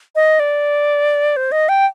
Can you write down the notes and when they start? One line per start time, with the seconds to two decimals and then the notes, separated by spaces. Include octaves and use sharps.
0.15 D#5
0.39 D5
1.36 C5
1.52 D#5
1.69 G5